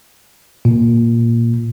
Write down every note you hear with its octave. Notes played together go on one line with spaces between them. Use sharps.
A#2